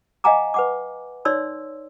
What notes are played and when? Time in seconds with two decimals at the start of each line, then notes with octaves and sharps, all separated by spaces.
0.24 D#5 F5 F#5 G#5 A#5 D6
0.54 B4 F#5 D6
1.25 D#4 C#5 D5 C6 E6